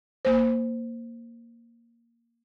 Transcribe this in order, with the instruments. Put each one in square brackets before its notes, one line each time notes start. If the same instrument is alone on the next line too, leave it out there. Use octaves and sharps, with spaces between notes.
[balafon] A#3 C5